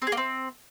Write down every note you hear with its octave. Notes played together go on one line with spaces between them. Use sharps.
C4
G#4
A#3
C4